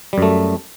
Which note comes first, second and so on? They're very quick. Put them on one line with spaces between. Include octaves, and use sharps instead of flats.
G3 F#2 A3